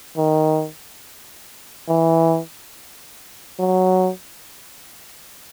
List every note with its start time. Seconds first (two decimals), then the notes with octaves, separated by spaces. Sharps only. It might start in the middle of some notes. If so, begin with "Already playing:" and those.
0.17 D#3
1.89 E3
3.60 F#3